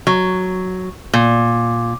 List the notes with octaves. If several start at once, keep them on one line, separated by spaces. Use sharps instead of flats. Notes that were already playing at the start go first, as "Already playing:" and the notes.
F#3
A#2